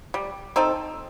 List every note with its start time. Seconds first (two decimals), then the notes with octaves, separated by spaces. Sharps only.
0.14 G3
0.56 C4 D#4 A4